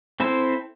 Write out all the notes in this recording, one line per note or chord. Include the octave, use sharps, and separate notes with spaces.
C4 E4 A4 C5